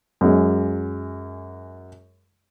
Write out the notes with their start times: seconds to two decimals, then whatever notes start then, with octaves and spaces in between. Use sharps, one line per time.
0.21 F#2 G#3